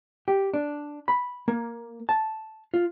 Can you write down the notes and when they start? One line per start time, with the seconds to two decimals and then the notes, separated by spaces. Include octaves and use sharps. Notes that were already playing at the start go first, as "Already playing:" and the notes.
0.28 G4
0.54 D4
1.08 B5
1.48 A#3
2.09 A5
2.74 F4